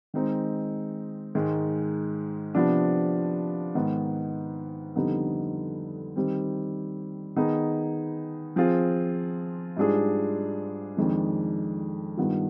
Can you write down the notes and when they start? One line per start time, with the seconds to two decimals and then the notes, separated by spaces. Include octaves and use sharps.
0.14 D#3 G#3 C4 D#4
1.35 G#2 D#3 G#3
2.55 C3 F3 B3 D4
3.75 G#2 D#3 B3
4.95 F2 D3 G3 B3 D#4
6.16 D#3 G3 C4
7.36 D#3 B3 D#4 G#4
8.56 F3 C4 F4 G#4
9.77 G#2 G3 D4 F4 G#4
10.97 F2 D#3 G#3 D4
12.17 G2 D#3 B3 F4